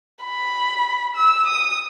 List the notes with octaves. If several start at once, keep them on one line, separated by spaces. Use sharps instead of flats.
B5
E6
D#6